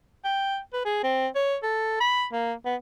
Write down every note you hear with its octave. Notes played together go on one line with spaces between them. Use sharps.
G5
B4
G#4
C4
C#5
A4
B5
A#3
B3